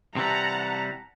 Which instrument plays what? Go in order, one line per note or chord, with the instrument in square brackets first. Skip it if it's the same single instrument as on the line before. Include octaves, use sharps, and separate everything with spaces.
[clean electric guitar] C3 E3 G3 [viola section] F#5 A5 A#5